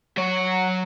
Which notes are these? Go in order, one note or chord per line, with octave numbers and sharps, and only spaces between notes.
F#3 C#5